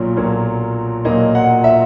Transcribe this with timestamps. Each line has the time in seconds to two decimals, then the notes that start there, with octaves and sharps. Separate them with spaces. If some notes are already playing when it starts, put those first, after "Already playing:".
Already playing: B1 A#2 F#3 A#3 C#5
0.17 B1 A#2 F#3 A#3
1.05 B1 A#2 F#3 A#3 D#5
1.35 F#5
1.64 E5